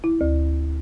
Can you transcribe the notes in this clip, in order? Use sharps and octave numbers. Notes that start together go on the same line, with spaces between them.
E4
D2